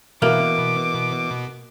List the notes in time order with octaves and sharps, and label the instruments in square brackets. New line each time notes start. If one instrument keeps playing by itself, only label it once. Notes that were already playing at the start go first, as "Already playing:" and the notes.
[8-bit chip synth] B2 [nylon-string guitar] E3 B4 [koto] A#3 [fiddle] D6